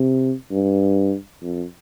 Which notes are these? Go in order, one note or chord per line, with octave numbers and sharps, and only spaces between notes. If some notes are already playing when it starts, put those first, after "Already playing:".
Already playing: C3
G2
F2